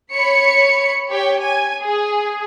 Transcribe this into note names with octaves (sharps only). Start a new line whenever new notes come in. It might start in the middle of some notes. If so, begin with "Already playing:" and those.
C#5 B5 C#7
G4 C#5 G5
G#5
G#4